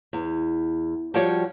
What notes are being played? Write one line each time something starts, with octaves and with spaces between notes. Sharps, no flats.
E2
F3 G3 F#4 G4 C#5